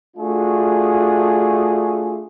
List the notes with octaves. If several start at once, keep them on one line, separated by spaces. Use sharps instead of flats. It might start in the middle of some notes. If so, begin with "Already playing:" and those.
A3 D4 F4 F#4 G#4